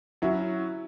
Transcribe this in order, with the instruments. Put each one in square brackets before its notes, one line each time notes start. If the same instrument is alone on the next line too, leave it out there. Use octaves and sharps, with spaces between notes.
[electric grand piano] F#3 C#4 F#4 [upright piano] E4